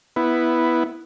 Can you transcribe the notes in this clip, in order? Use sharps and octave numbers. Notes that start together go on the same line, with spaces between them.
B3 E4